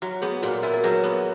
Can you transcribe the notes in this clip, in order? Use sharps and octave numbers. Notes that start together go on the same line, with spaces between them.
F#3 F#4
B3 G#4
A#2 F#4
E4 F#4 A#4
A#4
F#3 G#4 B4
B3